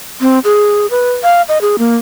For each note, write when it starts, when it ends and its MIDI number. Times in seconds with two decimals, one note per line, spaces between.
0.21 0.39 60
0.44 0.86 68
0.91 1.13 71
1.23 1.42 77
1.49 1.58 75
1.62 1.76 68
1.79 1.96 58